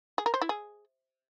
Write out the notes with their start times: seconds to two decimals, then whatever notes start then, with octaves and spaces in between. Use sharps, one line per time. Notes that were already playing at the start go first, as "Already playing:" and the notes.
0.18 G#4
0.26 A#4
0.34 C5
0.41 E4
0.49 G#4